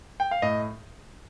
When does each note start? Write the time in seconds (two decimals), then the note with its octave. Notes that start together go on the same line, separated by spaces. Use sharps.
0.20 G5
0.31 F5
0.42 A2 D#5